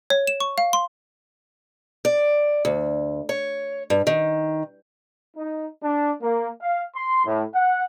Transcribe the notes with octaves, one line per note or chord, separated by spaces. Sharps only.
C#5
E7
C#6
F5
C6
D5
D2
C#5
G2
D#3
D#4
D4
A#3
F5
C6
A2
F#5